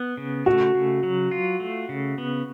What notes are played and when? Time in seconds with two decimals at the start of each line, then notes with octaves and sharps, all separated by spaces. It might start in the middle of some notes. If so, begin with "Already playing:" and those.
Already playing: B3
0.17 C#3
0.46 A3 F#4
0.75 C#3
1.03 F#3
1.31 F4
1.60 A3
1.89 C#3
2.18 B3